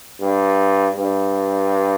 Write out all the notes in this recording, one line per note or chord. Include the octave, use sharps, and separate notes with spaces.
G2
G2